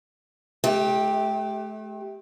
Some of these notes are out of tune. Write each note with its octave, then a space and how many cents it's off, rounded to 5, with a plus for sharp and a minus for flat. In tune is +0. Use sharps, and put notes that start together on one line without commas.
A3 -40 G4 +0